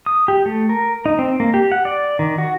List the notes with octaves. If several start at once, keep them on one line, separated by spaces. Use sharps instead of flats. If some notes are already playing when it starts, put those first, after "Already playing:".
D#6
G4
A3
A#4
D#4
C4
A#3
G4
F#5
D5
D#3
F#4